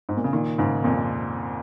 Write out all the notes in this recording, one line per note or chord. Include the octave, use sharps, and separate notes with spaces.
G#2
A#2
C#3
A#2 D#3
G#2 C#3
F2 A#2